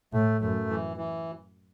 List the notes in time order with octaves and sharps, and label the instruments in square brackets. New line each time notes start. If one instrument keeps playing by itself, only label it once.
[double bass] A2 [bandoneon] A3
[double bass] F#2 [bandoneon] A3
[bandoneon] E3
E3